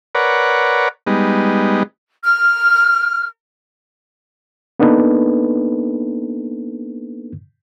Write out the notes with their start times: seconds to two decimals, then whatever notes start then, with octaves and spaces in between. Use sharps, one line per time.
0.15 A#4 B4 C#5 D5 F#5
1.07 G3 G#3 B3 D#4
2.22 F6
4.79 A#3 B3 D4 D#4 A4 B4